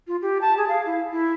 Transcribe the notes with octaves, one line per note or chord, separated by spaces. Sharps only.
F4
G4
A5
G#4
F5
E4
E4